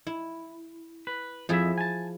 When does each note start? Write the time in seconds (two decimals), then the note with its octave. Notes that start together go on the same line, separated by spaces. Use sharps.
0.07 E4
1.07 B4
1.49 F2 F3 E4 G#4 E5
1.78 G#5 A5